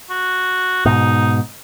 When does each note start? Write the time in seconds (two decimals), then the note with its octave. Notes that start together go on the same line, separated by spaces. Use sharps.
0.10 F#4
0.85 G#2 B2 D#4